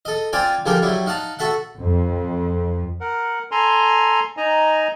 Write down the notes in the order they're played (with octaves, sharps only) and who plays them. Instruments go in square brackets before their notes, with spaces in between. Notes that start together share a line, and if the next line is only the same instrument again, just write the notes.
[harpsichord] A4 D#5
C4 F4 D5 G#5 A#5
D3 F3 G3 G4 G#4 A#4
F#3 G3 E4
D#4 F5 F#5 A5
F#4 A4 E5 F#5
[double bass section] F2
[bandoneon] A#4 F#5
A4 G#5 A#5 C6
D#4 D#5 G#5 A#5